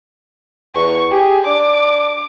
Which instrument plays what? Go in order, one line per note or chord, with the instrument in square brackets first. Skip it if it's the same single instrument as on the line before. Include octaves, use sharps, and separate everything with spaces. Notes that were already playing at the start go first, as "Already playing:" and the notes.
[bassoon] E2 [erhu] C#6
[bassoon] G4 [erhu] G#4
[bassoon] D4 [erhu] D6